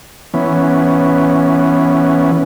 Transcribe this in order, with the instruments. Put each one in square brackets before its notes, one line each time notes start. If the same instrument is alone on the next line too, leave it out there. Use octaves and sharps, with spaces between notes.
[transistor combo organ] E3 B3 C#4